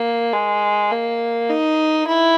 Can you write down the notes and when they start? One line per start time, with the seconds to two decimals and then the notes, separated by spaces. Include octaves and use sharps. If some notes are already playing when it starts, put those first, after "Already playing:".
Already playing: A#3
0.32 G#3
0.91 A#3
1.50 D#4
2.08 E4